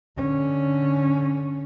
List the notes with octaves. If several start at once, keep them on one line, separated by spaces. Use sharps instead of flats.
D3 C#4